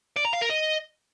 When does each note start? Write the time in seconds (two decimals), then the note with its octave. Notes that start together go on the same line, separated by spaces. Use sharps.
0.16 D5
0.25 A#5
0.33 F5
0.41 A#4
0.50 D#5